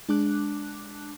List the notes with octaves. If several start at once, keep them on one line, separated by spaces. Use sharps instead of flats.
G#3 D4 A5 D6 F#6